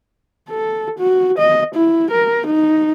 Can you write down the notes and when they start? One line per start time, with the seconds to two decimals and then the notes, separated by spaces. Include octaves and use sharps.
0.50 A4
0.99 F#4
1.38 D#5
1.75 E4
2.11 A#4
2.46 D#4